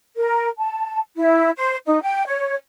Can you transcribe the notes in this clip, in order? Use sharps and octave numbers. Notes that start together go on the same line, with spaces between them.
A#4
A5
E4
C5
D#4
G5
C#5